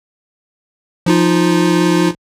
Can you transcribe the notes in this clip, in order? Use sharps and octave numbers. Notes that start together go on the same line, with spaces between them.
F3 D#4 F4